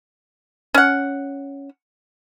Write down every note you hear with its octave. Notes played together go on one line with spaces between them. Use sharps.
C#4 F#5